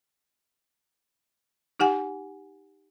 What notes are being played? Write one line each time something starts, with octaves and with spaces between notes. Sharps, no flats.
D#4 G4 F#5 G#5